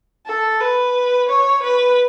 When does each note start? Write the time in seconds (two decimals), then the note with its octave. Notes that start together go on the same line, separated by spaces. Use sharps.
0.26 A4
0.60 B4
1.28 C#5
1.62 B4